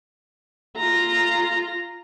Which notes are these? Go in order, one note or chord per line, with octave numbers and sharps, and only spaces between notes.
F4 A#5